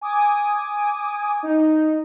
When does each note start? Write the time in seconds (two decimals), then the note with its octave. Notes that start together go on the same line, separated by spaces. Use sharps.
0.01 G#5 D6 D#6
1.43 D#4